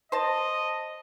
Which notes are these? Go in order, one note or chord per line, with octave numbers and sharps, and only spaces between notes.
C5 D#5 A5